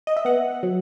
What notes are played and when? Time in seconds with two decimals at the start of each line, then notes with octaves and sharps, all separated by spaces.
0.07 D#5
0.16 E5
0.25 B3 F#5
0.63 F#3